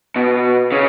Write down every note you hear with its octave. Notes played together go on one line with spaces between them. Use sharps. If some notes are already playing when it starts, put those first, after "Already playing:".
B2
C#3